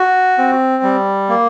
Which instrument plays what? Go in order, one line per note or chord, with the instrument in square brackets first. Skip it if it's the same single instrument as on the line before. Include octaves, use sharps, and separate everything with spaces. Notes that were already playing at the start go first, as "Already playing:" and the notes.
Already playing: [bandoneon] F#4
C4
G3
A#3